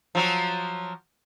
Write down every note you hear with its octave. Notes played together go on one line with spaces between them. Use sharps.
F3 F#3 F#4